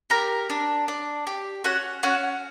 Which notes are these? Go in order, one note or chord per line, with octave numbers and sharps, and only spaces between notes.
G4 A#4 A#5
D4
D4
G4
C#4 F#4 F#5
C#4 F#4 F#5